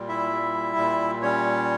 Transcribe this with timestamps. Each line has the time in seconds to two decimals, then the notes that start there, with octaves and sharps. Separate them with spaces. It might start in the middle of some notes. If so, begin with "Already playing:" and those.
Already playing: A#2 G3
0.09 E4 E5
0.31 G3
0.77 A#2
1.22 G3 C#4 C#5